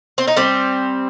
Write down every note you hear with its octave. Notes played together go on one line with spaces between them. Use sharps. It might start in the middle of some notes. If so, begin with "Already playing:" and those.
C4
D#4
G3 C4